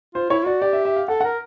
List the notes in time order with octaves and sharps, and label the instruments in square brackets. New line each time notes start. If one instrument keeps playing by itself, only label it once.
[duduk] F4 [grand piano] C5
[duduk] E4 [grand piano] C#5
[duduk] F#4 [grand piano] D5
[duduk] G4 [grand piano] D5
[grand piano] E5
E5
F5
[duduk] A4 [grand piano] F#5
[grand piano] F#5
[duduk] A#4